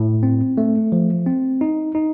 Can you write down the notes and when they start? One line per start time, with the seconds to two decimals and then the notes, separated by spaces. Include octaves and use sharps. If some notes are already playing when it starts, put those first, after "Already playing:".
Already playing: A2
0.23 C4
0.58 A3
0.92 F3
1.27 C4
1.61 D#4
1.95 D#4